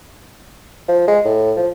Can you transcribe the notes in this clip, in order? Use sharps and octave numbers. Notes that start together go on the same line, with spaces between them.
F3
G#3
A2
F3